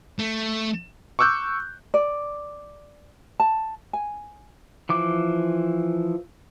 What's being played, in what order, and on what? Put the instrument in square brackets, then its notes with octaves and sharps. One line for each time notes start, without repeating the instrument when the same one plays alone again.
[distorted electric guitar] A3
[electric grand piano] C#6 D6 E6 F#6 G6
[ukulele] D5
A5
G#5
[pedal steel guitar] E3 F3 D6